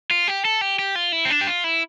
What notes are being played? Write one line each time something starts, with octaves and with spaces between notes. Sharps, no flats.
F4
G4
A4
G4
G4
F4
E4
C4
D4
G4
F4
E4